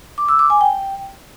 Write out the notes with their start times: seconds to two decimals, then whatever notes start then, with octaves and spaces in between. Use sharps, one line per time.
0.18 D6
0.29 E6
0.39 D6
0.50 G#5
0.61 G5